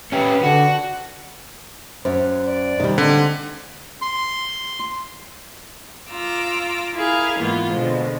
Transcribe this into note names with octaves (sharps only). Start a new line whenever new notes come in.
C#4 G4 B4
D3 F#4
F#2 C5
D5
C3 D#3 G3
D3 G#3 C4
C6
F4 A#5 D6 E6
E4 G#4 A#4 F5
G#2 E3 A#3 B3 F4
B2 D3 F3 G#3